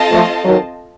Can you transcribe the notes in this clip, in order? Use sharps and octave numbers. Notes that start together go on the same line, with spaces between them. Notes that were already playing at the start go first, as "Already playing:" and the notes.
Already playing: C4 F4 A4 D#5 A5
F3 A3
D#3 F#3